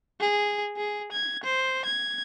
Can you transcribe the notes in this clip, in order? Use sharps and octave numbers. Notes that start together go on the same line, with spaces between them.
G#4
G#4
G#6
C5
G#6